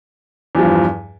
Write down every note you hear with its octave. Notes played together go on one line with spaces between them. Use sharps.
E2 G2 F3